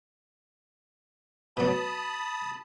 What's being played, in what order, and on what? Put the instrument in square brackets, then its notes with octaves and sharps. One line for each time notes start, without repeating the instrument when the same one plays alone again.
[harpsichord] B2 F#3 [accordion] A5 B5 D#6